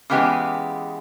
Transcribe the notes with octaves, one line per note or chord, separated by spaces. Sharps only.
C#3 E3 G#3 B3 G4